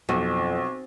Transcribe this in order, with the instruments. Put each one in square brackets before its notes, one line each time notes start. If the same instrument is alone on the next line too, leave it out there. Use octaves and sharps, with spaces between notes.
[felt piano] B1 [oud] F2